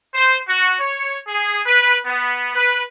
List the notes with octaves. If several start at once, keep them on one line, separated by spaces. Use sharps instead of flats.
C5
F#4
C#5
G#4
B4
B3
B4